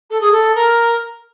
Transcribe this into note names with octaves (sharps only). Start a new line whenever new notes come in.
A4
G#4
A4
A#4